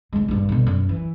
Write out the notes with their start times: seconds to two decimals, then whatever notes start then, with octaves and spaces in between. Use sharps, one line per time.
0.13 D1 G#3
0.28 A#1 G2
0.49 B2 D3
0.67 F#2
0.89 E3